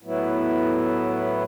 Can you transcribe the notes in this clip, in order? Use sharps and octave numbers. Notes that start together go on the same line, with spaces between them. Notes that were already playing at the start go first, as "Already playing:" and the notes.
A2 F#3 B3 E4